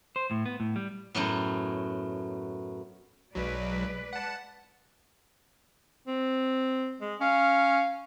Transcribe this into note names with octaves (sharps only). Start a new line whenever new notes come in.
C5
A2
B3
A2
G3
F#2 A2 F#3 B3
B1 F#3 G#3 B4 D5
F#5 A5
C4
G#3
C#4 F5